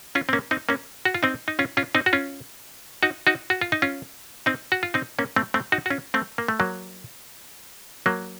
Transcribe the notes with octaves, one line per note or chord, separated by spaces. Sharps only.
C#4 F4
C4
A#3 C#4
C4 D#4
A#3 C#4
F#4
F4
C4 D#4
D#4
C#4 F4
C#4 F4
C4 D#4
F#4
C#4 F4
D#4 F#4
D#4 F#4
F#4
F4
D#4
C#4 F4
C4 D#4
F#4
F4
C4 D#4
A#3 C#4
A3 C4
A3 C4
D#4 F#4
F#4
C#4 F4
A3 C4
A#3
A3
F#3 A#3
F#3 A#3